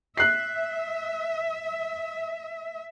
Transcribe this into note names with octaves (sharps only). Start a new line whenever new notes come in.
E5 F#6 C7